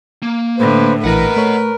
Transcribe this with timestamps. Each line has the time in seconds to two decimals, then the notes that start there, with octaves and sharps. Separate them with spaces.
0.23 A#3
0.58 A2 D3 B4 C5
1.04 A#1 E3 A#4 B4 D#5 F#5 A#6
1.37 A3 C#5